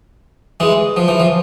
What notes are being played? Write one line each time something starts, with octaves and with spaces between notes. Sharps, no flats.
E3 G#3
F3
E3
F3